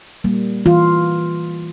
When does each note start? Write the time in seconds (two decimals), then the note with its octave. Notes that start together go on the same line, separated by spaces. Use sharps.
0.24 G3 A#3
0.66 E3 F4